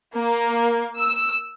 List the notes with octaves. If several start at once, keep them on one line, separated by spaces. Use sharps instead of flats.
A#3
E6